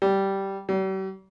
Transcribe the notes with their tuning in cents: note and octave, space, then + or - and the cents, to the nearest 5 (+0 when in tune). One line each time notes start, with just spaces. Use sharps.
G3 -10
G3 -45